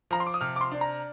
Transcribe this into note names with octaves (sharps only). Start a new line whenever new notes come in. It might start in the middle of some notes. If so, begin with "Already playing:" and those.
F3 A#5
C6
D6
D#6
C3 F6
D6
C6
D4
A#5